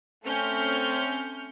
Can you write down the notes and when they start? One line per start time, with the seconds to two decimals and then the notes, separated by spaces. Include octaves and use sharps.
0.24 A3 C4 C#4 F6 G6 C#7